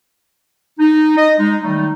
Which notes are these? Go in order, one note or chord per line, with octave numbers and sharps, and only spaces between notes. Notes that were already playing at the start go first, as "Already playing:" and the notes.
D#4
D#5
G#3 D#4
D#3 F#3 G3 A3 D#4